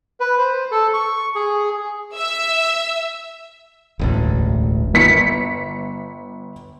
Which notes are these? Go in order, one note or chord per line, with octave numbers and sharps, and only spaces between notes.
B4
C5
A4
C#6
G#4
E5 E6
E1 A1 D2
G1 B6 C#7